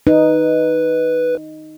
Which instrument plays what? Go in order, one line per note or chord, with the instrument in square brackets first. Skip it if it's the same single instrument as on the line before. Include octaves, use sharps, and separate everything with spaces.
[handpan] D#4 [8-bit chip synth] B4